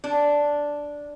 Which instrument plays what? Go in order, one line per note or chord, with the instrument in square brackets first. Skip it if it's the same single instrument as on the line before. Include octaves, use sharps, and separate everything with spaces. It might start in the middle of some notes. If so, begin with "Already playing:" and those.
[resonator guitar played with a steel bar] D4